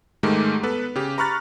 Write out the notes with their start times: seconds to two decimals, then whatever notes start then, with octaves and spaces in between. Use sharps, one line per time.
0.23 G#2 D#3 G#3 A3 G4
0.63 B3 A4 B4
0.95 C#3 G4
1.18 A#5 B5 C#6 F6 F#6 A6